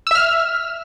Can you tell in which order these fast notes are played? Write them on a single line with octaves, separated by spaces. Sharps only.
E6 E5 F6